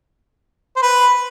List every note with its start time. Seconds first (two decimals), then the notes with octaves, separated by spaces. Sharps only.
0.76 C5
0.82 B4